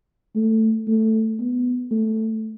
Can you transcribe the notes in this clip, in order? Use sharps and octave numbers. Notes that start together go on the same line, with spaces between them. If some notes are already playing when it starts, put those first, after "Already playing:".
A3
A3
B3
A3